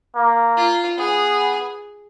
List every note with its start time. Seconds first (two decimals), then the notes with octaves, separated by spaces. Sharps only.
0.15 A#3
0.57 F4
0.97 B3 G#4